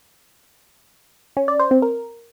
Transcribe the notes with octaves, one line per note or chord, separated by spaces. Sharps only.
C#4
D5
C5
C4
A#4